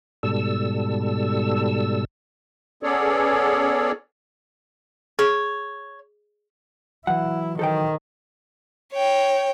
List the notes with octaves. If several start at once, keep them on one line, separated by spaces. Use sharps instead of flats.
G#2 B2 G3 A4 E6
B3 C#4 G#4 A4 C#5 D5
G#4 C#5
E3 F#3 E4 F#5
D#3 A4 C5 G5
C#5 G5